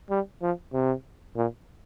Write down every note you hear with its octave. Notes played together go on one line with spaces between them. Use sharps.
G3
F3
C3
A#2